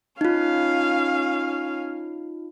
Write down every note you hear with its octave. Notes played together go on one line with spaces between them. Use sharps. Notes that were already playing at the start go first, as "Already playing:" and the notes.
C#4 D#4 F4 F5